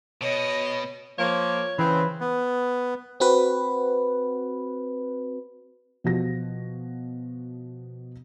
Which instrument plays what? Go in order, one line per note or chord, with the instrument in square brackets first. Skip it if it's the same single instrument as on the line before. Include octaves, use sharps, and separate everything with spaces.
[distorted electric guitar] B2 [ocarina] C#5 [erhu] D#5
[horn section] F3 A#3 [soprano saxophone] C#5
[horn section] C#3 C4 [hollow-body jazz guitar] E3 [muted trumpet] B4
[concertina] B3
[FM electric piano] C4 F#4 B4
[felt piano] B2 F3 F#4 A#6